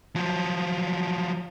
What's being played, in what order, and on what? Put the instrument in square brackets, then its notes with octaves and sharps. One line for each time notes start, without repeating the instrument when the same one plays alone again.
[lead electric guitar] F3 F#3